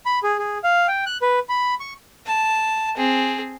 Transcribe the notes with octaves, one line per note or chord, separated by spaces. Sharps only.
B5
G#4
G#4
F5
G5
F#6
B4
B5
C#6
A5
C4 G#4